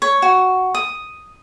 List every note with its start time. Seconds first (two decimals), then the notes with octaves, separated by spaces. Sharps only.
0.02 C#5
0.22 F#4
0.75 D#6